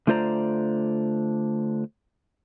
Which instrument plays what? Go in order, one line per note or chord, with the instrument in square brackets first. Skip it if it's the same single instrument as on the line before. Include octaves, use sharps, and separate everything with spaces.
[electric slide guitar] D3 A3 F4 C5 D5 A#5